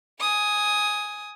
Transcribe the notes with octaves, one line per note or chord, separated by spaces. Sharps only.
G#5 D#6